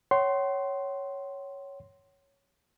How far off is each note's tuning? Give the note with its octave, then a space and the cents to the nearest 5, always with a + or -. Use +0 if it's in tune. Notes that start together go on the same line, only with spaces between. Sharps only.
C#5 +0 F#5 +45 C6 +0